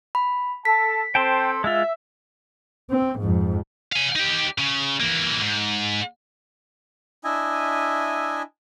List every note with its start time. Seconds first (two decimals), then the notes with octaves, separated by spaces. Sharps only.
0.15 B5
0.65 A4 A5 B6
1.15 C4 A4 C5 G5 A5 C6
1.64 G#3 F4 E5
2.90 C4
3.20 F2 G#2
3.93 F5 G#5
4.15 D#4 G4
4.58 C#3
5.00 E3 A#3
5.41 G#2
7.24 D4 E4 D#5 E5 G#5